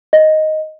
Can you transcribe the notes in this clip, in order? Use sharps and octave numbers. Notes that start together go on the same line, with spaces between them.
D#5